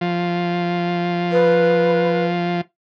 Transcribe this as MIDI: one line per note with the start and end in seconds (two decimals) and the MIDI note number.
0.01 2.61 53
1.31 2.25 71